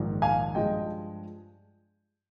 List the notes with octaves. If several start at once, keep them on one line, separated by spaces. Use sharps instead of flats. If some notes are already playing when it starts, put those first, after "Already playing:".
Already playing: A#1 G#2 D#3
F5 G#5
G2 F3 G#3 D#5 G5